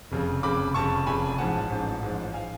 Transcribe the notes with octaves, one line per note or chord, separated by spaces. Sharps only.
F1 F2 C#3
F1 F2 C#3 B5 D6
F1 F2 C#3 A5 C#6
F1 F2 C#3 G#5 B5
A1 G#2 F3 F#5 A5
A1 G#2 F3
A1 G#2 F3
F3 F5 G#5